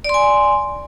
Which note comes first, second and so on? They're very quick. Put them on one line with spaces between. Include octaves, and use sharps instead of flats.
D5 C6 G#5